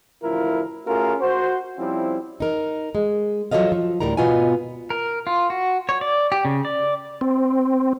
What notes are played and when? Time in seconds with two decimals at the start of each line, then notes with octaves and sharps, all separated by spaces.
0.23 A1 D2 F3 E4 F4 A#4
0.86 A3 C#4 F4 F#4 G#4 A#4
1.21 F#4 C5
1.78 F3 G3 C4 C#4 E4
2.40 D#4 A#4
2.95 G#3
3.51 F3 F#3 G#4 A4 D#5 F5
3.72 F3
4.00 D2 A2 G3 A#4 A#5
4.17 G#2 B2 B3 F4 D#5 G#5
4.90 A#4
5.27 F4
5.50 F#4
5.89 C#5
6.01 D5
6.32 G4
6.45 C#3
6.65 D5
7.21 C4